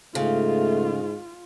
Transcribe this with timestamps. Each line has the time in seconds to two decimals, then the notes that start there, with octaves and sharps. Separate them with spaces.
0.15 G#2 C#3 A3 F4